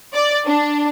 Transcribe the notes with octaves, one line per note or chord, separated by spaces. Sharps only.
D5
D4